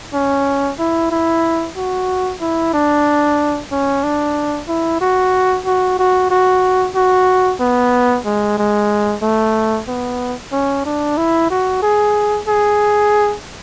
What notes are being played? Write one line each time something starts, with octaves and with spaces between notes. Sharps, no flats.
C#4
E4
E4
F#4
E4
D4
C#4
D4
E4
F#4
F#4
F#4
F#4
F#4
B3
G#3
G#3
A3
B3
C#4
D4
E4
F#4
G#4
G#4